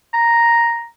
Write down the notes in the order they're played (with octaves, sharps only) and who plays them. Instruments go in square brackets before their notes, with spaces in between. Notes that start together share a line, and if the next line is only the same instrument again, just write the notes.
[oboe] A#5